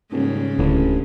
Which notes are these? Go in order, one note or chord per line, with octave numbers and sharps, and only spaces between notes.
D#1 G#2 C#3
D1 A1 D3